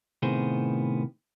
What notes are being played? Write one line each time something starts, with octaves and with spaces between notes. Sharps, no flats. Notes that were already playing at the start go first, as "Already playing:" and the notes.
A2 C3 D#3 B3 G#4 C5